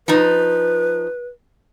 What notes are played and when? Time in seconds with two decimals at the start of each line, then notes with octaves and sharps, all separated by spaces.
0.08 F3 D#4 B4